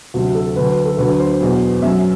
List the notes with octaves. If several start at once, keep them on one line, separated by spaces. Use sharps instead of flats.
D2 C3 F#3 F#4
A4
D2 D3 F#3 B4
B4
A4
D2 D3 F#3 B4
C5
E2 B2 F#3
F#2 F#3 E5